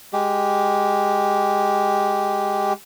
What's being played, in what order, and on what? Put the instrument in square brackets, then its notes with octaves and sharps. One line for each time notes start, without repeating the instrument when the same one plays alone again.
[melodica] G#3 G4